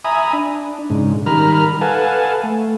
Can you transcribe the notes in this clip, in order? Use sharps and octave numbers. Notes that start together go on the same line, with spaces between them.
E5 G#5 A#5 B5 D#6
D4
G#2 C#3
D#3 G3 A#4 A#5 B5 F6
A4 B4 F5 F#5 G#5 A5
A3